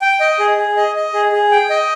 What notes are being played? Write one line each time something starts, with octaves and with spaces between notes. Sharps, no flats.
G5
D#5
G#4
G#4
D#5
D#5
G#4
G#4
G5
D#5